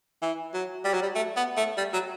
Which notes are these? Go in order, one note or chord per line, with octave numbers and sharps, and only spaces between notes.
E3
F#3
G3
F#3
G3
A3
B3
A3
G3
F#3